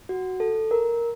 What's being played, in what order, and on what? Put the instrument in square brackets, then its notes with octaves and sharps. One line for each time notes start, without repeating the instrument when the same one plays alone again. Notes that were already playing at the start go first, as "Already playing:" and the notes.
[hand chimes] F#4
A4
A#4